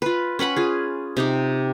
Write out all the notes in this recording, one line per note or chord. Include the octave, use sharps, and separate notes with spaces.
F4 B4
C#4 B4 F#5 B5
F4 G#4
C3 D#4 G4